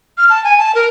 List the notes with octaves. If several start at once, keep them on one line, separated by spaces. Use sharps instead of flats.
F6
A5
G#5
A5
A#4